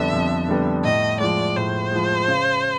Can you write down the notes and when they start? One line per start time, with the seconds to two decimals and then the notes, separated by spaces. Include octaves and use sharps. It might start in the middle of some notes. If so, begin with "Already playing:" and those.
Already playing: F2 D3 G3 B3 E5
0.13 F2
0.48 D3 G3 B3
0.84 A2 D#5
1.20 F3 G#3 D5
1.56 A2 C5
1.91 F3 G#3
2.28 C#3